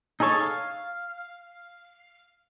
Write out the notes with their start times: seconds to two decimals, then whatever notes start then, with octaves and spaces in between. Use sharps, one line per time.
0.20 D#4 G#4 A4 C#5 A5
0.41 F5